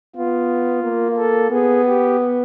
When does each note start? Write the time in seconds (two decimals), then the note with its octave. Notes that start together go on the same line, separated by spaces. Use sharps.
0.16 B3 F4
0.83 A#3
1.17 A4
1.51 B3 G#4
1.86 G4